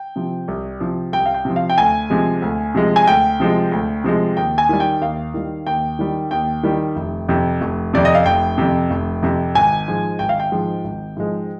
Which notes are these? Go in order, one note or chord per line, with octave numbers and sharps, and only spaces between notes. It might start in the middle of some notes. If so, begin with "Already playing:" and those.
Already playing: G5
C3 F3
C2
C3 F3
C2 G5
F5
G5
C3 F3
F5
G5
D2 G#5
C3 F3 G#3
D2
C3 F3 G#3
G#5
D2 G5
C3 F3 G#3
D2
C3 F3 G#3
D#2 G5
G#5
D#3 G3
G5
D#2 F5
D#3 G3
D#2 G5
D#3 G3
D#2 G5
D#3 G3
F1
F2 C3
F1
F2 C3 D5
D#5
F5
F1 G5
F2 C3
F1
F2 C3
G#1 G#5
G#2 F3 G#3
G#1 G5
F5
G5
G#2 F3 G#3
G#1
G#2 F3 G#3